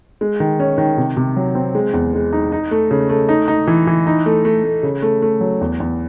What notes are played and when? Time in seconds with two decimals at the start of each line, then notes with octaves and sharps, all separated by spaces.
0.21 G#3
0.40 D#3
0.60 C#4
0.78 D#3
0.98 C3
1.17 C3
1.36 F#3
1.55 C4
1.75 G#3
1.94 E2
2.14 G#3
2.33 D#4
2.52 D#4
2.71 A3
2.91 C#3
3.09 A3
3.29 D#4
3.48 D#4
3.67 E3
3.87 E3
4.07 D#4
4.26 A3
4.45 A3
4.64 A3
4.83 C#3
5.02 A3
5.22 A3
5.41 F#3
5.61 E2
5.80 E2